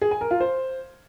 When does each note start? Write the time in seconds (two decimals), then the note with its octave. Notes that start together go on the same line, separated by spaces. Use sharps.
0.02 G#4
0.11 G#5
0.21 A#4
0.31 F4
0.40 C5